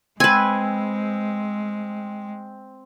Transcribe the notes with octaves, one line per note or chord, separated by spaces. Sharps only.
G#3 C4 B4 G#5